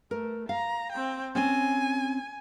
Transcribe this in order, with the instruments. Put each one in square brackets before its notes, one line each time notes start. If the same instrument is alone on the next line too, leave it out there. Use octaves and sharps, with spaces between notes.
[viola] A3 [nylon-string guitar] A#4
[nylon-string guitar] F5 [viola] A#5
[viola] C4 G5
[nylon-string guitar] C4 C#4 [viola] G#5